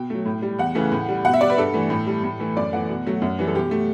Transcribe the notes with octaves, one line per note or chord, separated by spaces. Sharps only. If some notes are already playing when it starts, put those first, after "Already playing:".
Already playing: B2 G5
F#3 A3
A2
G3
E2 F#5
C#3 E3 A3
A2
G3
B2 F#5
E5
G3 D5
B4
G2 A4
E3 A3
A2
G3
A2
E3 A3
F#2 D5
E3 A3 F#5
B2
F#3 A3
F#2
E3 G3
A4
B2 G4
A3